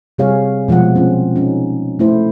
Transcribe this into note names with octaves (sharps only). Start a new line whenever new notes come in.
C3 G3 C4 G#4 C#5 F5
B2 F3 G#3 F#5
C4 C#4 F4
C#4 D#4
A3 E4 C5